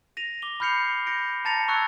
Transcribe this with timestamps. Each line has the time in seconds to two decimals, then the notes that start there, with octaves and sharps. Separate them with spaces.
0.17 A#6 D#7 F7
0.42 D6 G7
0.60 B5 F6 G6 C7 C#7 F7
1.07 G6 A#6 C#7 D7
1.45 A5 A#5 A6 A#6 C#7 F7
1.68 A5 C#6 E6 F#6 G#6 C#7